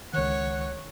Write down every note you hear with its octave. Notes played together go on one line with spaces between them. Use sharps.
C#2 D#3 C#5 F#5